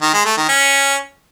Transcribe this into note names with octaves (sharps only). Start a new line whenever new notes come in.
D#3
G#3
A3
D#3
C#4